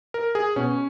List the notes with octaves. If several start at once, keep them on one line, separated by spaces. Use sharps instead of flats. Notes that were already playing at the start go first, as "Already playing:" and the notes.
A#4
G#4
B2 C#4